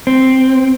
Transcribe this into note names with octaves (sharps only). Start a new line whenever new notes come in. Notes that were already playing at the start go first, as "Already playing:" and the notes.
C4